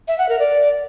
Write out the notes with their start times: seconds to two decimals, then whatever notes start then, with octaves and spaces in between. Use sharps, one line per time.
0.08 E5
0.18 F#5
0.29 A#4
0.39 D5